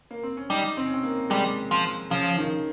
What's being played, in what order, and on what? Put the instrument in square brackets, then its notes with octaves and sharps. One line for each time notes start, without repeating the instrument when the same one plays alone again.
[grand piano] A#3
C4
C#4
[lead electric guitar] G3 [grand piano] D#4
[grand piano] C4
C#4
C4
A#3
[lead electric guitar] G3 [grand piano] G#3
[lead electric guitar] F3
[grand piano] C#3 [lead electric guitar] F3
[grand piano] D#3